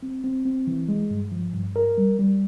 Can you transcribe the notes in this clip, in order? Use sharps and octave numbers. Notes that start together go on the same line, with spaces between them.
C4
C4
C4
E3
G#3
G2
F3
G2
A#4
G3
G3